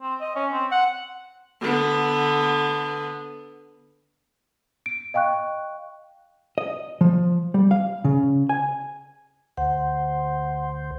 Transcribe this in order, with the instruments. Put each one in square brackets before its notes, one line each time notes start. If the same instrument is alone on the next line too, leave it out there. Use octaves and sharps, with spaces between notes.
[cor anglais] C4
D#5
C#4
C4
F#5
[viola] D3 B3
[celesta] D7
D#5 F5 G5 C#6 F#6
[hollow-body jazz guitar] D#5
F3
G3
F5
C#3
G#5
[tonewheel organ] D2 C5 [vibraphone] F#5